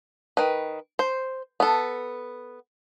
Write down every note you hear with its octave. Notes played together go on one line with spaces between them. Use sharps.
D#3 B4
C5
B3 A4